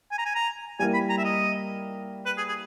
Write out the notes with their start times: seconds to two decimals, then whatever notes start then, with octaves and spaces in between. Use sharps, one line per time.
0.11 G#5
0.18 A#5
0.26 G#5
0.35 A#5
0.79 G3 A#3 E4 A#4 G#5
0.94 B5
1.10 A#5
1.18 E5
1.24 D#5
2.26 B4
2.37 G#4
2.48 G#4